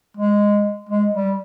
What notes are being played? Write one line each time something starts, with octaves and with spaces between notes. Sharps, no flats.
G#3
G#3
G3